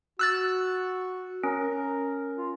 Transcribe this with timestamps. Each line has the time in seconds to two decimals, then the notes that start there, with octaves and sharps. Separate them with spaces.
0.19 F#4 E6 F#6 A6
1.43 C#4 A#4
2.37 F4